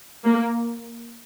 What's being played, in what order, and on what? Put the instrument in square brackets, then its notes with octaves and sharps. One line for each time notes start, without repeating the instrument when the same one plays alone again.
[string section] A#3